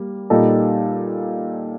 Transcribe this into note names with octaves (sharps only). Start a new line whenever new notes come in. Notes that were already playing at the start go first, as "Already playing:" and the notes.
Already playing: G3 A#3
A#2 G3 A#3 D#4 A4